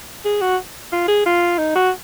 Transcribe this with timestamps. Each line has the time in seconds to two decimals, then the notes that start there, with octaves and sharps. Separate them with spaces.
0.25 G#4
0.42 F#4
0.93 F4
1.08 G#4
1.26 F4
1.59 D#4
1.76 F#4